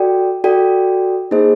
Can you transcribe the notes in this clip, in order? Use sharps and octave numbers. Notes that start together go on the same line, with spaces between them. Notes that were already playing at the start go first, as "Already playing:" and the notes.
Already playing: F#4 A4 D5 G5
F#4 A4 D5 G5
A#3 D#4 G#4 C5 D#5